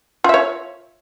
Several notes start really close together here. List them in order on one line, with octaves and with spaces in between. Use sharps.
F4 E5 C#5